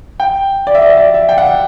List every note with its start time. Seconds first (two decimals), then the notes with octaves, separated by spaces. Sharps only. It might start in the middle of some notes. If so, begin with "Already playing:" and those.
0.20 G5
0.67 D5
0.75 E5
0.82 D5
0.89 E5
0.97 D5
1.14 E5
1.29 G5
1.38 F#5